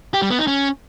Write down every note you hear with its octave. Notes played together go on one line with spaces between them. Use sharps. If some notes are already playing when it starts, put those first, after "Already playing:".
G4
G3
B3
D#4
C#4